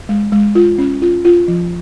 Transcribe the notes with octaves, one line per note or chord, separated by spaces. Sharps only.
G#3
G#3
F4
C#4
F4
F4
F3